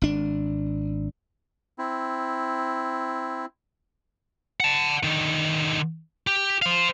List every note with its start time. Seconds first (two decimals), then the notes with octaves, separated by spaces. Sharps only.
0.02 G#1 D4
1.78 C4 E4
4.60 F#5 A5
5.03 D3 D#3
6.27 G4
6.62 C5 F5